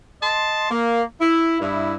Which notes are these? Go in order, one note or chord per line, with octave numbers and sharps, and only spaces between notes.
D#5 A5 C6
A#3
E4
G2 E4